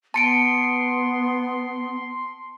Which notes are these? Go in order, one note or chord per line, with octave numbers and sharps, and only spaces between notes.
B3 A5 C6 C#7 D7